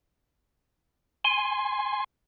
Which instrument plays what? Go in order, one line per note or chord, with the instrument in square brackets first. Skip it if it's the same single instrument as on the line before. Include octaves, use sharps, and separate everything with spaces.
[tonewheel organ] G#5 C6